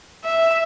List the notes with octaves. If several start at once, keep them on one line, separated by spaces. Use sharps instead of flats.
E5